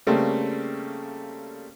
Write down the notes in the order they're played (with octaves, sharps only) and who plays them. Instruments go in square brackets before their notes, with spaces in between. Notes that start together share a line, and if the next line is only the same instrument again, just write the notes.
[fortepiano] C#3 G3 A3 A#3 C4